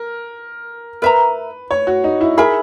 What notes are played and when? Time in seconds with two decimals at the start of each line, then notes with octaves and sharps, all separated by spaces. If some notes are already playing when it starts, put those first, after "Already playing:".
Already playing: A#4
1.02 A#4 B4 E5 A#5
1.71 C#5
1.87 F#4
2.04 D#4
2.21 E4
2.37 E4 G#4 A#4 E5 B5